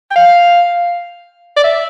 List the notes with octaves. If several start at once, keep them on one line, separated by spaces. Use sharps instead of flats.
G5
F5
D5
E5